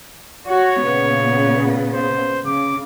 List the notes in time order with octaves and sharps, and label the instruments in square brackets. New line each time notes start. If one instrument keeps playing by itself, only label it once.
[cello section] F#4 [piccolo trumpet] C#5
[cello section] A#2 C#3 B3
[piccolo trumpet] C5
[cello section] C#3 [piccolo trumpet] D6